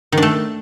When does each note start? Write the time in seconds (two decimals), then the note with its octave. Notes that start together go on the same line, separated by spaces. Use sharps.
0.12 D#3
0.17 D4
0.23 A3